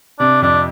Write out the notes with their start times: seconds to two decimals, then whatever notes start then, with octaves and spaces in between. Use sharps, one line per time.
0.19 C3 D4
0.42 F2 D4